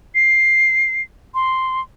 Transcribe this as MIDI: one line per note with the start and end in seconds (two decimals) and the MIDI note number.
0.15 1.02 96
1.34 1.80 84